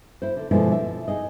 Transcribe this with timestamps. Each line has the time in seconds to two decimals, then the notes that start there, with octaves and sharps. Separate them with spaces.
0.22 E4 C5
0.36 D3
0.51 B2 D3 F3 G#3 E4
0.72 E5
1.08 D#4 G#4 D#5